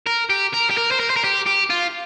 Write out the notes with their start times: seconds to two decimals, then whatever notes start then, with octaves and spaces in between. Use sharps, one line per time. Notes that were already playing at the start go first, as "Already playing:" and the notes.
0.07 A#4
0.30 G4
0.53 A#4
0.70 G4
0.77 A#4
0.91 C5
1.00 A#4
1.10 C5
1.16 A#4
1.24 G4
1.47 G4
1.70 F4